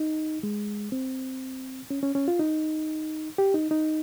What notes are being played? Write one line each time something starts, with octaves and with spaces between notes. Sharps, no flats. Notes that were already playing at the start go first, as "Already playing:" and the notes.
Already playing: D#4
G#3
C4
C#4
C#4
C#4
F4
D#4
G4
D#4
D#4